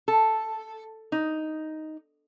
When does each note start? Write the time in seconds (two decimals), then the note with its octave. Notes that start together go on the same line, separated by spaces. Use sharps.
0.08 A4
1.12 D#4